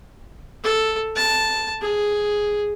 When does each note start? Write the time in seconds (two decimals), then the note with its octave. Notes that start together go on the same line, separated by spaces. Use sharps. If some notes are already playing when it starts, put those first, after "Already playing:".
0.64 A4
1.16 A5
1.81 G#4